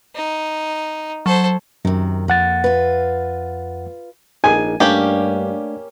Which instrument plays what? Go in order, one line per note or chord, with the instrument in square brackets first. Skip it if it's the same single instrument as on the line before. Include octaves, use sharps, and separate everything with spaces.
[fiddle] D#4
[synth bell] F#3 [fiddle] A4 C5
[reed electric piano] F#2 [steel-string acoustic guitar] C3 D#3
[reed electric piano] F2 F#5 A6 [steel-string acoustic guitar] A#3
[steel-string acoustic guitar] F4 B4
[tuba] A#1 [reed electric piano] D#4 G#4 A#4 [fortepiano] G#5
[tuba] G2 [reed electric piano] A3 D4 D5 [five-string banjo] A#3 C#4 G4